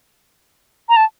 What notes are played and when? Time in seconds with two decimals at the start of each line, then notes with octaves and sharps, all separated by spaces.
0.89 A#5
0.96 A5